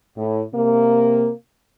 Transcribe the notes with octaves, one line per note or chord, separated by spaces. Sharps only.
A2
C3 A#3